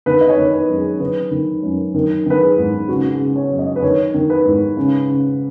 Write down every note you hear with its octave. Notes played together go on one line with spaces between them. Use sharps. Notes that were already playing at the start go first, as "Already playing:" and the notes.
D#3 B4
D#5
C#5
D#3
B4
F#2
G#4
D#3 B4
D#3
F#2
D#3
D#3 B4
G#4
G#2
C#3 F#4
F#4
G#4
C#3
C#5
F#2
D#5
B4
D#3 C#5
D#3
B4
G#2
C#3
C#3